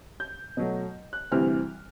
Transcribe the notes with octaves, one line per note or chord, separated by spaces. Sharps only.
G6
B2 F#3 A3
F#6
D2 C3 E3 G3 C4 F6